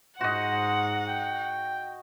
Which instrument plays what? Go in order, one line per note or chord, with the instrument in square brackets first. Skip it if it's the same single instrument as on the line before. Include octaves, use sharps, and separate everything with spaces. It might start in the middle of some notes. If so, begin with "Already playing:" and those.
[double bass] G#2 [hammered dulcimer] F#4 D#5 [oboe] C5 [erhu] F#5
[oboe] G5